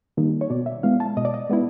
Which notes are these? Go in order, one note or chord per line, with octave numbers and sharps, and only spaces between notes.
D#3 G3 A#3 D#4
C#5
B2 D5
E5
G#3 B3 E4 F5
A5
B2 D#5
D5
D#5
G#3 B3 E4